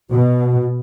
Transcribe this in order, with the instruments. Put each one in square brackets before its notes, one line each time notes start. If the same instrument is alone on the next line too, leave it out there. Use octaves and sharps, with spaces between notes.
[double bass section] B2 [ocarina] F#4